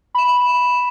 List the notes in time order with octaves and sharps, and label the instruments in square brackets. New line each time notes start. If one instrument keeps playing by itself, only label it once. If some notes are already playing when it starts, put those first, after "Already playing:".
[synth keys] B5 E7